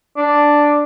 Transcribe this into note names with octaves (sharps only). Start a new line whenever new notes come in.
D4